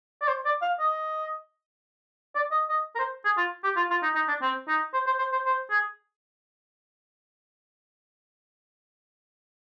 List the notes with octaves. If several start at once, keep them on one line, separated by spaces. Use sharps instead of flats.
D5
C5
D5
F5
D#5
D5
D#5
D#5
A#4
C5
G#4
F4
G4
F4
F4
D#4
D#4
D4
C4
D#4
C5
C5
C5
C5
C5
G#4